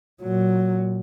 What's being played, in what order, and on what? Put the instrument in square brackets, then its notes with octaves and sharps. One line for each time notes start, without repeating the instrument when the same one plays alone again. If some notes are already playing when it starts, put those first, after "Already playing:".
[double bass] A#2 F#3